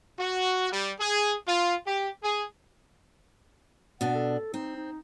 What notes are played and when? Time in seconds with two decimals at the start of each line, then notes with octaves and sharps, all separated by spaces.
0.19 F#4
0.72 G3
1.00 G#4
1.47 F4
1.86 G4
2.23 G#4
4.01 B2 D4 F#5
4.15 A4
4.54 C4 D#4
4.76 D#4